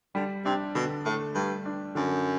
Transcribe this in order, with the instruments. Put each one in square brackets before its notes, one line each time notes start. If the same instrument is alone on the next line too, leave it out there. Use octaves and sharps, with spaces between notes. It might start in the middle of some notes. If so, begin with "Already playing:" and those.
[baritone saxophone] D3 [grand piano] G3
[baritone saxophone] C3 [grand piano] D4
[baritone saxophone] B2 [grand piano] D3
[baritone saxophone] A2 [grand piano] A3
[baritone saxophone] G2 [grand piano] G3
[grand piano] D4
[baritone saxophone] F#2 [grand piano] D3